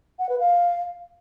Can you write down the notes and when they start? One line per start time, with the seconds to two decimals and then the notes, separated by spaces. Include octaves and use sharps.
0.19 F#5
0.29 B4
0.39 F5